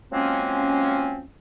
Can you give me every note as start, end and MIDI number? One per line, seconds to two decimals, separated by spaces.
0.12 1.23 53
0.12 1.23 54
0.12 1.23 56
0.12 1.23 58
0.12 1.23 60
0.12 1.23 61